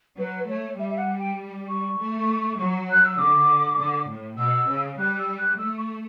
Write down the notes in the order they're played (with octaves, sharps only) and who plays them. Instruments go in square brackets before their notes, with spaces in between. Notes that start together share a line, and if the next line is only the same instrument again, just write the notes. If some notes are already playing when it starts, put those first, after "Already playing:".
[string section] F#3 [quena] B4
[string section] A3 [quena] C#5
[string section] G3 [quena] E5
[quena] E5
F#5
G5
C#6
[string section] A3
F#3
[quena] F#6
E6
[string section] D3 [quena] D6
[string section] D3
A2
[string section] B2 [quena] E6
[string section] C#3
[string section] G3 [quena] F#6
[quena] F#6
E6
F#6
[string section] A3 [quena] E6
[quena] C#6